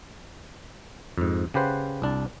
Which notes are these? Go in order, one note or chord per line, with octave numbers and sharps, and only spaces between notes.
F2 G#2
C#3 G4 B4 C5 F#5
C2 D4 A5